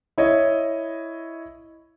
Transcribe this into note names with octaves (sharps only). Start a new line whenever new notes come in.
E4 C#5 D#5